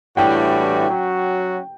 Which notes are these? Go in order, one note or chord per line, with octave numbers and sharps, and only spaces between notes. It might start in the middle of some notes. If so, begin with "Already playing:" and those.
A2 E3 G3 D4 F#4 G5
F#3 C#4 F#4